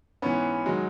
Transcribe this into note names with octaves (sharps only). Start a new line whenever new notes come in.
G#2 E3 B3 C#4
D#3 F#3 G#3